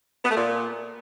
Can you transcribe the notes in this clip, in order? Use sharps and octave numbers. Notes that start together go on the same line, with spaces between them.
B3
A3
A#2